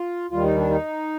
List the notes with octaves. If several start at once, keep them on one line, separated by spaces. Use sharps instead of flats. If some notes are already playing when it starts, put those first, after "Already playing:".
Already playing: F4
D#2 D#3 G3 F4
D#4
D4
D#4